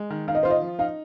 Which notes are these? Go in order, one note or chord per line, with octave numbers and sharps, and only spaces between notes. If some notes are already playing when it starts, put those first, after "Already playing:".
Already playing: G#3
D#3
D#3 F5
D#5
F4 C5
D#5
F3
D#4 F5